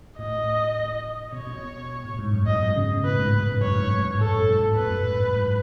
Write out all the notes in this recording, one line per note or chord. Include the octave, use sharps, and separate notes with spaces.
A2 D#5
B2 C#5
B2
A2
G#2
F#2
G#2 D#5
B2
C#3
B2
A2 B4
G#2
A2
G#2
F#2 C#5
G#2
A2
G#2
F#2 A4
G#2
B2
A2
A2 B4
F#2
G#2
F#2
G#2